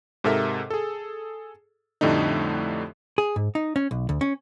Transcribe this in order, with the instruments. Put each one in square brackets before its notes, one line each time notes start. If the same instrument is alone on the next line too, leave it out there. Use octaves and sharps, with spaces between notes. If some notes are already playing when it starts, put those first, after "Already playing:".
[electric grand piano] G#2 C3 A4 A#4 E5
G#4 A4
F2 A2 D3 G3 A3 D#4
[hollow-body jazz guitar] G#4
G#2
D#4
C#4
B1
D2
C#4